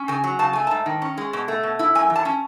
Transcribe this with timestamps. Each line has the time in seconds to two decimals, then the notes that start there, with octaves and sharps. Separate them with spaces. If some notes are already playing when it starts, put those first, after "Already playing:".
Already playing: C#4
0.08 C#3 G#5
0.24 F#3
0.39 C#3 A5
0.53 A3 G#5
0.67 G#2 A5
0.86 D#3
1.02 C#4
1.18 G#3
1.33 B2
1.48 A3
1.63 B2
1.79 E4
1.95 F#2 G#5
2.10 E3
2.16 A5
2.25 C#4